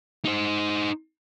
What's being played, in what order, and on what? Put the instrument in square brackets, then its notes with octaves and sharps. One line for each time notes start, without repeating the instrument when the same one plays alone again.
[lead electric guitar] D#4 C5